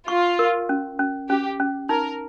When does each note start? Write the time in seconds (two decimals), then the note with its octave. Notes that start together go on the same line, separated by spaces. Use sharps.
0.08 F4 C#6
0.39 A#4
0.69 C#4
0.99 C#4
1.29 C#4 G4
1.60 C#4
1.89 D#4 A#4